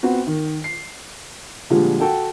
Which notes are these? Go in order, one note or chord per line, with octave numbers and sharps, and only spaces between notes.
B3 C4 F#4
D#3
C7
A#2 D3 F3 G3 G#3
F#4 A4 G5